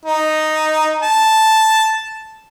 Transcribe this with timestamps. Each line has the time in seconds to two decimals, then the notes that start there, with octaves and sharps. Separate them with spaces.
0.05 D#4
1.03 A5